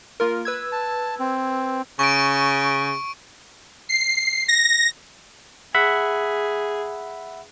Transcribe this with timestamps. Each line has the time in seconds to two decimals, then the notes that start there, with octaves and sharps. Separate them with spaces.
0.20 A#3 F4 A#4
0.45 B4 E6 G#6
0.72 A5
1.20 C4
1.99 C#3 C#6 D7
3.89 C7
4.48 A#6
5.75 G#4 E5 F#5 B5